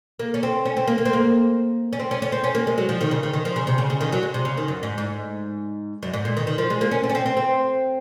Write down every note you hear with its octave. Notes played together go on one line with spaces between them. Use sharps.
A#3
C#4
C4
C#4
C4
A#3
A#3
C4
A#3
C#4
C4
C#4
C#4
C4
C#4
A#3
G#3
F#3
F3
D#3
C#3
D#3
D#3
F3
C#3
C3
C#3
C#3
D#3
F#3
G#3
C3
C#3
D#3
F#2
G#2
G#2
F#2
G#2
A#2
D#3
D#3
F3
G#3
A#3
C#4
C4
C#4
C4
C4
C4